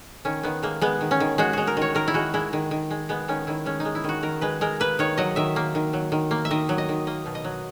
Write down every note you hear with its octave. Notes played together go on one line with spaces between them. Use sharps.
D#3 C#4
D#3 B3
G#3 A#3
G#3 B3
D#3
C#4
D#3
G#3 F#4
G#3 F#4
A#4
D#3 C#5
D#3 A#4
E4
G#3 F#4
G#3 E4
D#3
D#3
G#3
G#3 B3
D#3 C#4
D#3 E4
G#3 C#4
G#3 D#4
E4
D#3 F#4
D#3 A#4
G#3 B4
G#3 A#4
A#3 B4
D#3 C#5
F#3 D#5
D#3 E5
A#3
D#3
F#3
D#3
A#3
E5
D#3 D#5
F#3
D#5
D#3
A#3 D#5
B2
D#5
F#3